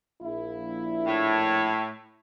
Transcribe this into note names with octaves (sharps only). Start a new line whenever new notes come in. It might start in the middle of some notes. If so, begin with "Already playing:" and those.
A#1 E4
A2